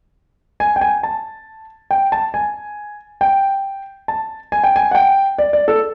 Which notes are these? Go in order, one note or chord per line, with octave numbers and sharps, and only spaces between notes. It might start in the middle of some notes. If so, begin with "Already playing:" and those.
G#5
G5
G#5
A5
G5
A5
G#5
G5
A5
G#5
G5
G#5
F#5
G5
D5
D5
A4